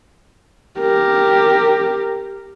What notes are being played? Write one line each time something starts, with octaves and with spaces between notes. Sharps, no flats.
G4 A#4